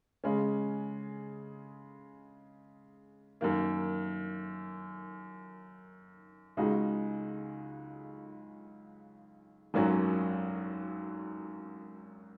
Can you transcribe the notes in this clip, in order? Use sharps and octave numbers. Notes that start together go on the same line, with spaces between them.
C#3 G#3 C#4
F#2 D#3 A#3
C#2 C#3 G#3 D#4 F#4
G#1 F#2 F#3 C#4 F#4